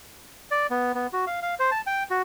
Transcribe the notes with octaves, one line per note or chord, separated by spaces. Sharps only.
D5
B3
B3
F#4
F5
F5
C5
A5
G5
F#4